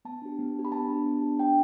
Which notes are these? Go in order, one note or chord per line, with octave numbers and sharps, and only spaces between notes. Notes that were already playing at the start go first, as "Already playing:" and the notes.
B3 A5
D4 G4
B3
D4 G4
B5
B3 A5
D4 G4
B3
D4 G4
D4 G5